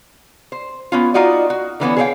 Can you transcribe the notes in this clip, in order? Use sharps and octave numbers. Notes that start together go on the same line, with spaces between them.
C5
B3 C#4 F4
D#4 F4 F#4 D5 D#5
F#4
D3 E3 B3 C#4
G#4 C5 C#5 D#5 F5 G5